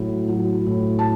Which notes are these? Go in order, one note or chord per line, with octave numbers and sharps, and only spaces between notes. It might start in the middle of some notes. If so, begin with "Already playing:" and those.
Already playing: A2 F#3
F#3
A2
A5